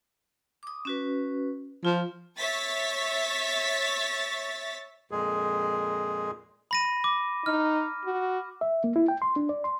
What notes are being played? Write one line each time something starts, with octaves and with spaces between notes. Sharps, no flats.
D6 D#6
C#4 F#4 B4
F3 F4
C#5 E5 C#6 A6 B6
F2 A#2 G#3 G#4
B5 A#6 D#7
D6
D#4 F6
F#4
E5
A#3
E4
G5
C6
D4
D5
C6